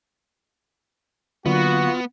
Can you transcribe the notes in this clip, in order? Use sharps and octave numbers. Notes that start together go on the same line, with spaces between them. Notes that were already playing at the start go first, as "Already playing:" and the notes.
D3 F#3 A#3 B3 F4 F#4